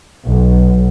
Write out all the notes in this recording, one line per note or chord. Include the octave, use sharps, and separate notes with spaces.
B1